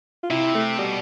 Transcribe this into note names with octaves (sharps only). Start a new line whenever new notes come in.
F4
C3 E4
A3
B2 G3